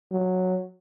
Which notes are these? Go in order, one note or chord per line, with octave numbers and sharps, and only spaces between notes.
F#3